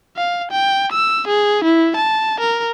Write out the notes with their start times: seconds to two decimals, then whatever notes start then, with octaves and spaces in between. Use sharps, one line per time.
0.17 F5
0.51 G5
0.92 E6
1.28 G#4
1.64 E4
1.96 A5
2.40 A#4